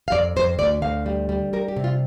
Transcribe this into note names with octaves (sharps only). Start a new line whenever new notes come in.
F5
F2 D5
F2 C5
D2 D5
D2 F5
G3
G3
G3 A#4
G4
C3
F4